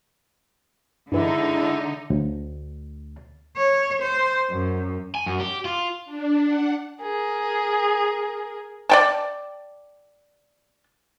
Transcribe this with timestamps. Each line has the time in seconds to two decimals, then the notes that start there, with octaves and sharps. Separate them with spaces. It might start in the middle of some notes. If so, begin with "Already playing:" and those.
1.12 G2 D3 E3 G#3 D#4 E4
2.10 D2
3.57 C#5
4.02 C5
4.50 F#2
5.15 G#5
5.26 F#2
5.40 G4
5.65 F4
6.05 D4
6.45 F#5
7.02 G#4 A#4
8.89 D5 G5 A5